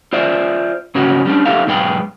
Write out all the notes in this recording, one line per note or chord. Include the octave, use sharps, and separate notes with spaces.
F4 C5 D5 E5
G#2 C#3 C#4 F#4
G3 C#4 D4
D#4 G4 A4 E5 F5
B1 G#2 G#3 G#4 B4 G5